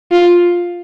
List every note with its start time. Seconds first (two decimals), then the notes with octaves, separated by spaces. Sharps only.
0.12 F4